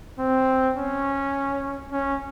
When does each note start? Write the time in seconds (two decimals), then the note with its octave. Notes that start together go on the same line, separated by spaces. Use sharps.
0.19 C4
0.76 C#4
1.91 C#4